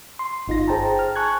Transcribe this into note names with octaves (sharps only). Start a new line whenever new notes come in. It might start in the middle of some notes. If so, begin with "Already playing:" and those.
C6
G1 D#4 F4 A#6
G#4 C5 G5 A5 A#5
F6
G#5 A5 C#6 F#6 G#6